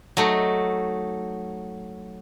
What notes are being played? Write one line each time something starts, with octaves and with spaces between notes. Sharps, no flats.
F#3 A3 D#4